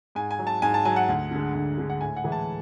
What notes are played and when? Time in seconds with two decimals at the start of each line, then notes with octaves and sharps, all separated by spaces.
0.15 G#2 G#5
0.31 G#5
0.39 F#3
0.47 A5
0.62 G#2 G#5
0.74 A5
0.85 F#3 G#5
0.96 F#5
1.08 D2
1.31 D3 G#3
1.55 D2
1.78 D3 G#3
1.90 F#5
2.00 A2 G#5
2.16 F#5
2.24 E3 G#3
2.32 A5